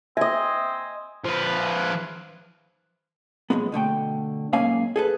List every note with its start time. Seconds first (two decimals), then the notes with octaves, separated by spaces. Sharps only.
0.17 C4 D#5 E5 G#5
1.25 F3 B4
3.50 B1 F2 G#3 B3
3.72 B2 D3 A3 G5
4.53 B1 G#2 A#3 C#4 F5 G#5
4.96 G#4 A4 B4